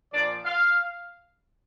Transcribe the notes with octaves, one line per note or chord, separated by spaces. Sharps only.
A#2 F3 D5
F5